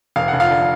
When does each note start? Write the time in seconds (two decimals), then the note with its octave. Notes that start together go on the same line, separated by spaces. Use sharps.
0.16 F1 F5
0.28 F#5
0.33 F1
0.40 F4 F5
0.51 D3